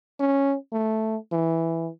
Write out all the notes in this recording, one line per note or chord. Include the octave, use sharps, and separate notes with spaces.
C#4
A3
E3